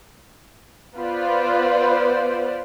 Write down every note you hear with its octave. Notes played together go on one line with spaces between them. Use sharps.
B3 F4 B4 C5 D5